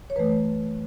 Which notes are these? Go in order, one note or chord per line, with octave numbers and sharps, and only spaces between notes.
C#5
F#2 E3 A3 B4